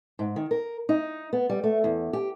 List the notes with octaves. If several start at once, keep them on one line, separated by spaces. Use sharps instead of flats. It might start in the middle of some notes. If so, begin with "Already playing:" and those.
G#2
D#3
A#4
D#4
B3
G3
A3
E2
G4